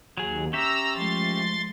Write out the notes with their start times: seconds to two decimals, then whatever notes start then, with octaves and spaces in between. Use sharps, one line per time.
0.17 D#2 F#3 G#4
0.53 C#4 G4 E5 A#5 E6
0.94 F3 G#3 A3 C6 A6